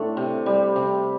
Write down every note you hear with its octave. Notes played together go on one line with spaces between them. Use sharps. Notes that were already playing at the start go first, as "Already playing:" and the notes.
Already playing: A2 A3 C4 D4
C3
G3
C3